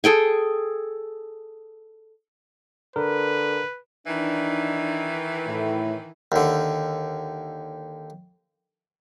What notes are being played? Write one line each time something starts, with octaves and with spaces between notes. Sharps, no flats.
G#4 A4 G5 G#5
D3 A#4 B4
D#3 E3 D4 D#4
A2
D#2 D3